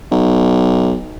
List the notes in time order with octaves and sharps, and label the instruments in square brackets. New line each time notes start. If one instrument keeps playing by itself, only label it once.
[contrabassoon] B1